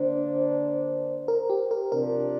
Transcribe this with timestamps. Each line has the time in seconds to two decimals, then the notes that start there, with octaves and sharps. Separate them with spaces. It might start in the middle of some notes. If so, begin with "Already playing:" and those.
Already playing: D3 A#3 D4 C5
1.28 A#4
1.50 G4
1.71 A#4
1.92 C3 F3 D4 A#4